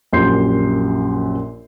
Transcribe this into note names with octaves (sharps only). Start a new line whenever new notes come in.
A#1 F#2 G4 C6 G6 C7